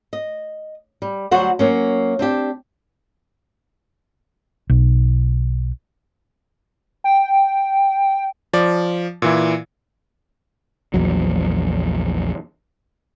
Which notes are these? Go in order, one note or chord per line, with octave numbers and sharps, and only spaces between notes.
D#5
G3
D2 F#3 G3 F#4 C5 F#5
F#3 A#3 C#4
C4 D4 G4
B1
G5
F3 D5
A#2 E3 E4
A#1 E2 F#3